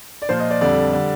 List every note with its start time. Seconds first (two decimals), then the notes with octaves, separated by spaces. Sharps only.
0.22 D5
0.29 A#2 F3 C5
0.40 D#5
0.51 D5
0.61 F2 D3 G3 D5
0.92 D3 G3